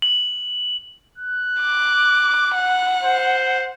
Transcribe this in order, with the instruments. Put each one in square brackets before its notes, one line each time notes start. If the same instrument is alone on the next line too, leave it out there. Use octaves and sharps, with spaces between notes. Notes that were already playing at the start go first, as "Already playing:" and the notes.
[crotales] F#7
[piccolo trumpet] F#6
[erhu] D6
F#5
[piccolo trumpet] C5